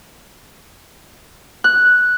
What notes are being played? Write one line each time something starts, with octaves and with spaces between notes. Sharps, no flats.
F#6